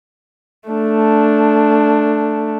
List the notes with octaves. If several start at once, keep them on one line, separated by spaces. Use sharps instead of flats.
A3 D4